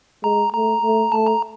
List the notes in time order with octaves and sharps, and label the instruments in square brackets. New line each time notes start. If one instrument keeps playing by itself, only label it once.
[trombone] G#3 [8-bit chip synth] A#5
[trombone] A3 [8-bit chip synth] A#5
[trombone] A3
[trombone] A3 [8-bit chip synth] A5
[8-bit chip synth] A#5